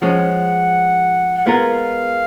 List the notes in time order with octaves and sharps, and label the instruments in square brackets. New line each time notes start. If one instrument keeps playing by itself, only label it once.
[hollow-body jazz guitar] F3 G#3 C#4 [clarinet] F#5
[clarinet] F#5
[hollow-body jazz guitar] G#3 B3 F4 A#4 [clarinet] F5